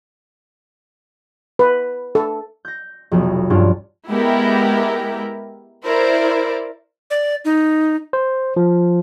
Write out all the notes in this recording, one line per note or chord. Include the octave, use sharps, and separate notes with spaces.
B4
A4
G6 A#6
F1 B1
G2 C#4 D4 F4
G#3 B3 E4 G4 A#4
E4 A#4 C5 D5
D5
D#4
C5
F3